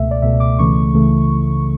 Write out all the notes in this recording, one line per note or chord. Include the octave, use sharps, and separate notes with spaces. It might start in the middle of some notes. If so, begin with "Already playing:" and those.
Already playing: C#2 B2 A3 E5
D5
C#2 B2 A3 E5
D6
C#2 C#3 E3 A3 C#6
C#2 C#3 E3 A3